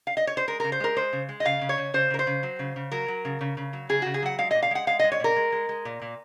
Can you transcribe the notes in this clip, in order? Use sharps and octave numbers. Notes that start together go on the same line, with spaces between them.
F5
D#5
C#5
C5
G#3 A#4
C#3 A#4
C5
G#3 A#4
G#3 C5
C#3
G#3
D#5
C#3 F5
C#3
C#5
C#3
C#3 C5
C#3 A#4
C5
C#3
F#3
C#3
C#3
F#3 A#4
F#3
C#3
C#3
C#3
F#3
C#3 G#4
C#3 F#4
G#4
F#3 F#5
G#3 F5
A#2 D#5
F5
G#3 F#5
G#3 F5
G#3 D#5
C#5
A#2 A#4
G#3
G#3
G#3
A#2
A#2